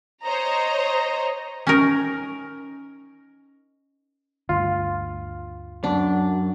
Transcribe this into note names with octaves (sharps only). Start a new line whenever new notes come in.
C5 C#5 D#5 A#5
C#4 D#4 A#4
D2 G2 F4
F#2 D4